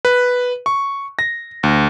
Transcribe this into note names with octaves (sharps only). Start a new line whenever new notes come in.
B4
C#6
A#6
D2